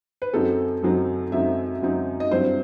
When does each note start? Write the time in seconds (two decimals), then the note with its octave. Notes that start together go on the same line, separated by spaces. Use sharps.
0.22 B4
0.33 F#2 F#3 C4 D#4 A4
0.83 F#2 F#3 C4 D#4
1.32 F#2 F#3 C4 D#4 E5
1.82 F#2 F#3 C4 D#4
2.20 D#5
2.31 G2 F#3 C4 E4 C5